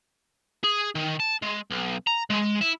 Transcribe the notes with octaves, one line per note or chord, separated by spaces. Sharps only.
G#4
D#3
A5
G#3
B1
A#5
G#3
E4